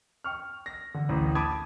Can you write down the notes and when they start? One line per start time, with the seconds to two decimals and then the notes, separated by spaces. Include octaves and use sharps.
0.24 G5 C#6 F6
0.66 A#6
0.94 D3
1.09 A1 D2 A2
1.35 A5 B5 D6 D#6 G#6